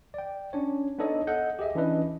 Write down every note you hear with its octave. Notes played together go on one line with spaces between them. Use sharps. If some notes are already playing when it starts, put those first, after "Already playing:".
D5 G5
C#4 D4 C#5
B3 D4 D#4 A4 C#5 D#5
A4 D#5 F#5 G6
G4 G#4 D#5 E5
E3 C#4 D4 E4 B4 D#5